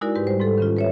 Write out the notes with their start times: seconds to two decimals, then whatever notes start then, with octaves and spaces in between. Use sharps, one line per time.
0.01 G#3 D#4 E4 F#4 A#4 D5
0.15 G#2 G4 B4
0.27 G3 C5
0.40 G#2 A4
0.58 D#3 C#4 F4
0.76 B4 C#5 E5